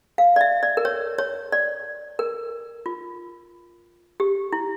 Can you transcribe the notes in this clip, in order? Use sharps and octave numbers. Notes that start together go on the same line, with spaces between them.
F5
D5
E5
D5
A#4
C#5
C#5
D5
A#4
F4
G4
E4